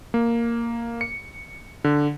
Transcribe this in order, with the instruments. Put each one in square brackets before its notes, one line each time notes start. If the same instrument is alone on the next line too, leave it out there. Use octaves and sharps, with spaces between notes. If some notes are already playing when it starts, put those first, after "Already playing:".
[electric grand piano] A#3
C#7
D3